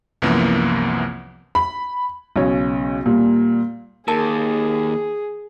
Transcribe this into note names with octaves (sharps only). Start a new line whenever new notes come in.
C2 F#2 E3 F3 A#3 B3
B5
B1 C#3 C#5
A#2 G3
D#2 G#4 A#4 A5